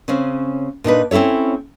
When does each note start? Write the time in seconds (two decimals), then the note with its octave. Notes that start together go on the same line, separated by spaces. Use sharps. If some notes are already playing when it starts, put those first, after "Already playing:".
0.08 C#3 C4 C#4
0.84 A#2 D4 D#4 B4
1.11 C4 C#4 E4 A4 C#5